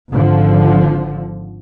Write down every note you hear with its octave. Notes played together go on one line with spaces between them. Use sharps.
G#1 D3 F3